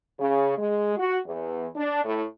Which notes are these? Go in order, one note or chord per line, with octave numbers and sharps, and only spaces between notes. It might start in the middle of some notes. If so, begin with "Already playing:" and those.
C#3
G#3
F#4
E2
D4
A2